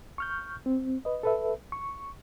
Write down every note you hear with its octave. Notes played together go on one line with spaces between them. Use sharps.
C#6 F6 G6
C4
B4 D#5
A4 B4 E5
C#6